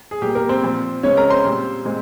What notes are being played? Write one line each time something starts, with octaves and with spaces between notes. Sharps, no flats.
G#4
A#2 G3 A#3 G4
A#3 A#4
C4 C5
A#2 F3 C4
C#3 G#3 C4 C#4 C#5
A#4 A#5
C5 C6
A#2 G3 C4
A#2 G#3 C4